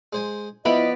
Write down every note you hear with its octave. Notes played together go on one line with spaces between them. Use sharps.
G#3 C5 G#5
F3 B3 E4 D5 D#5 B5